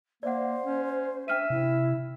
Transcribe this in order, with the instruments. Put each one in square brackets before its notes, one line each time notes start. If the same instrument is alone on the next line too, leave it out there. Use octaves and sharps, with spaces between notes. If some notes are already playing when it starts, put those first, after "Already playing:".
[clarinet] A#3 [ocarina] C5 [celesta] D5 E5 F#5
[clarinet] C#4
[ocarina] D4 [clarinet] E5 [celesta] G5 F6 D#7
[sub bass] C3 [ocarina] E4